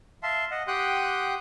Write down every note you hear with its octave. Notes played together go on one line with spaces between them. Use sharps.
E5 F5 A5 C6
D#5 F#5
G4 F#5 G5 C6 D#6 F#6